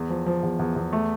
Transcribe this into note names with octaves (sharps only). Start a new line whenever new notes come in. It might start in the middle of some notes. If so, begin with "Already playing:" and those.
Already playing: E2
F3
F3
E2
E2
E2
A3